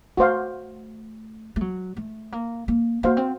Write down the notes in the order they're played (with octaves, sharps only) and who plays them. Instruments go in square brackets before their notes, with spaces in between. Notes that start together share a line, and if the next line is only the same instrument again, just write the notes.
[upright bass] A3 [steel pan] F#4 C5 F5
[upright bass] A3
F#3
A3
A#3
A#3
[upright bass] A#3 [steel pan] F#4 C5 F5
[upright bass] C4